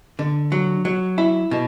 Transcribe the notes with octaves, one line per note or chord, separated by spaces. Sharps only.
D3
F#3
F#3
E4
B2